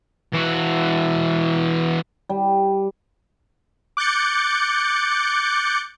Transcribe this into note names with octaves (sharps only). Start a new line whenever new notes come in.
E3 F#4
G3
D6 F#6 G6 A6 C#7